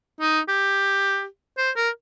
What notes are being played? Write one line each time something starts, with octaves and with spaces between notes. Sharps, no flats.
D#4
G4
C5
A#4